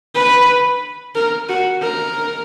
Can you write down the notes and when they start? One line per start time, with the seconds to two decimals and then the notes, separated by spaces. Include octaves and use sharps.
0.15 B4
1.15 A#4
1.49 F#4
1.82 A#4